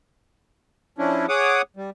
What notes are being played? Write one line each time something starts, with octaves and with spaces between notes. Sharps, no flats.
F3 C#4 D4 E4
G#4 C#5 F#5 D6 D#6
G3